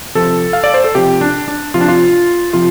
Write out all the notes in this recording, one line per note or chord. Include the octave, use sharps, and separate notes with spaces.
C3 F3 A4
F5
D5
C5
A4
C3 F3 G4
D4
D4
C3 F3 F4
D4
F4
C3 F3 F4